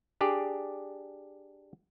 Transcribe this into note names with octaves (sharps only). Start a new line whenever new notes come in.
D4 G4 G#4 D5